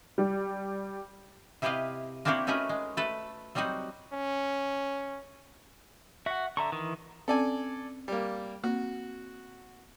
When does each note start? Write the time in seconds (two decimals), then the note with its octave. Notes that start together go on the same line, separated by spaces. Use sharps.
0.18 G3
1.62 C3 E4 G4 B4 D#5 F5
2.25 A#3 C4 D4 E4 F#4 G4
2.47 A3 C#4 D#4 F#4 A#4 B4
2.69 G#3
2.97 A3 A4 B4
3.55 F#3 G3 C4 D#4 F#4
4.13 C#4
6.26 F#4 E5 F#5
6.57 D3 E5 A#5 C#6
6.72 D#3 E3
7.28 C4 C#4 A4 D5 G#5 A5
8.08 G3 A#3
8.64 A#3 C4 F#4